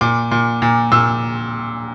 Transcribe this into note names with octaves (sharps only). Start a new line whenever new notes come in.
A#2 D6
A#2
A#2
A#2 E6